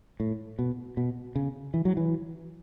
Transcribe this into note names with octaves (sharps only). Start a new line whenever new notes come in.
A2
B2
B2
C#3
E3
F#3
E3